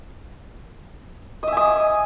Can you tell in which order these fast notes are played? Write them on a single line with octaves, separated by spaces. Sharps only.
D#5 E5 G#5 D#6